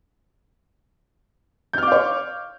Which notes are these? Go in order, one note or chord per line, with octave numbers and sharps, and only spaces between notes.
C#5 F5 D6 F6 G6